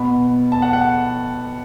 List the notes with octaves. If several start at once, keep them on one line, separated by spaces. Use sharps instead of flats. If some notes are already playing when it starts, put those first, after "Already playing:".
Already playing: B2 B3 B5
A5
F#5
F#5